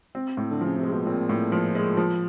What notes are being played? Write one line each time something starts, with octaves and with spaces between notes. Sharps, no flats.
C4
A2
D3
C#3 F3
C3 G#3
B2
A#2 C4
A2
F3
G#3
F3